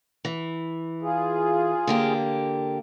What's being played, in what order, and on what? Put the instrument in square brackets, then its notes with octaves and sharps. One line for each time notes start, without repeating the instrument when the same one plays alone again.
[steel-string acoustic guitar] E3
[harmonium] F4 G#4
[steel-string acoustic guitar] D3 A#3 G4